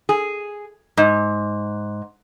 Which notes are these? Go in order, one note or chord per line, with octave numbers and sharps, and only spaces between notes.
G#4
G#2